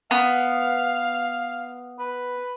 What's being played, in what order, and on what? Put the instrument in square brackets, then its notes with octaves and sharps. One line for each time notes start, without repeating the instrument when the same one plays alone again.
[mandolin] B3 [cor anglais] F5
[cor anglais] B4